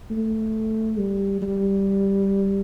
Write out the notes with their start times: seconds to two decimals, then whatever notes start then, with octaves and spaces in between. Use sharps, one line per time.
0.11 A3
0.99 G3
1.42 G3